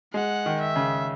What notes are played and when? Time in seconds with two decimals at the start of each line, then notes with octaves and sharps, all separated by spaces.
0.14 G#3 F#5
0.46 D#3
0.61 E5
0.76 C#3